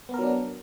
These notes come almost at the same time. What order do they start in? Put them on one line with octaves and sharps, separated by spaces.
B3 A#4 F#3 D4